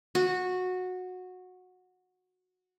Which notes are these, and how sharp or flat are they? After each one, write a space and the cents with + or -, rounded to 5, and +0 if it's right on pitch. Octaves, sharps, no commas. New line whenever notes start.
F#4 -15